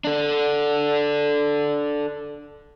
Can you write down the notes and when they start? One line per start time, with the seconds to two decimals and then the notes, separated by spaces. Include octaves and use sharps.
0.04 D4 A4